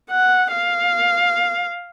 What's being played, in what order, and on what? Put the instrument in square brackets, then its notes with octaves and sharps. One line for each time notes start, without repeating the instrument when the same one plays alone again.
[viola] F#5
F5